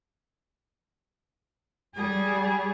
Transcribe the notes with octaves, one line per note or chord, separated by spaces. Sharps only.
G3 G#4